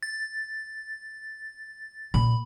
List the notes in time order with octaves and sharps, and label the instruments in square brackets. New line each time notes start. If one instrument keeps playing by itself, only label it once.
[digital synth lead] A6
[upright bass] A#2 [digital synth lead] B5